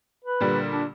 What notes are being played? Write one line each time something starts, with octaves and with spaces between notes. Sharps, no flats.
B4
A#2 D3 G3
D4